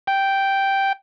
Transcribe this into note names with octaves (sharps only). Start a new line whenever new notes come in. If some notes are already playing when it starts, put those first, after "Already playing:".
G5